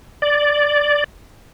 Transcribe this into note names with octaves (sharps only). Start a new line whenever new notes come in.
D5